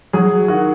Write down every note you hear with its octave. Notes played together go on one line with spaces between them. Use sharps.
F#3 G#4
D#3 F#4